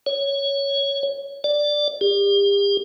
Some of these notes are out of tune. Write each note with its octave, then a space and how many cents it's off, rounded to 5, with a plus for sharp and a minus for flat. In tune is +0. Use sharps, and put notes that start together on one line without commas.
C#5 +5
D5 +5
G4 +40